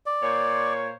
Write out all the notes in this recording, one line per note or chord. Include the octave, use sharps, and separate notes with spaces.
D5
A#2 C5 C#5